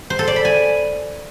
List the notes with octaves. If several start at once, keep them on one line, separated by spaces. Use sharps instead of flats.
C5
A4
D5
B5
G#5